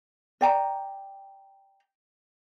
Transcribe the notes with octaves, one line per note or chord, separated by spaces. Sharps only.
D5 G5 A#5